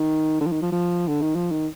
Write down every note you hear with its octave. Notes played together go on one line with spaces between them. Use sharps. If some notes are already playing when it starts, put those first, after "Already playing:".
Already playing: D#3
D3
F3
D#3
F3
F3
D3
D#3
F3
D#3